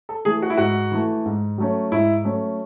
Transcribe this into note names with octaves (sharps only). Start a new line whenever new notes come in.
A4
E3 A3 G#4
F#4
E4
G#2 F#4
E3 A3
G#2
F#3 A3 C#4
G#2 E4
F#3 A3 C#4